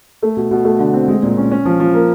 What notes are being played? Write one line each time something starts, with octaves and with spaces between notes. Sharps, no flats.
A3
B2
B2
A3
D3
C4
G#3
A#2
C#4
C#4
F3
F3
A#3